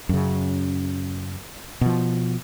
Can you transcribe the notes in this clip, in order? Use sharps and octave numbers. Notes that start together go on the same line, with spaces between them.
F#2 C#3
B2 F3